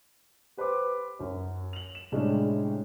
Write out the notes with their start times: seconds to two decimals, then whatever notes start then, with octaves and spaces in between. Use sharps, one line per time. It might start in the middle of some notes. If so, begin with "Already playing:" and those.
0.57 G4 B4 C5 C6 D6
1.19 F#2 C#4
1.73 F7 F#7
1.95 E7
2.12 A2 C3 G3 G#3 C#4 D4